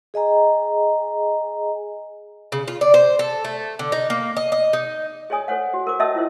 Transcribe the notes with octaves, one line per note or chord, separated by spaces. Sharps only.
G#4 D#5 G#5 A#5
C#3
F4
D5
C5
A4
A3
D3
D#4
A#3
D#5
D#5
D#4
G#4 C#5 D5 G#5 D#6
A4 C5 C#5 F#5
F#4
A#4 C5 D6
C#4 D#5 E5 A5 D#6 E6
C#4 E4 F4 C5